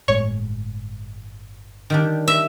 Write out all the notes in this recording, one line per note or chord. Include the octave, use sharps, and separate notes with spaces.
G1 A2 G#3 C#5
D#3 G3 D4
E5